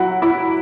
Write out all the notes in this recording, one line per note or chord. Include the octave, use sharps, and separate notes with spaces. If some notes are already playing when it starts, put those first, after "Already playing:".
Already playing: F#3 E4 F#5
E4